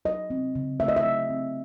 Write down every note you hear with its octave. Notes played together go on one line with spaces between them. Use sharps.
F#3 D#5
C4
C#3
A3 E5
D#5
E5
F#3
C4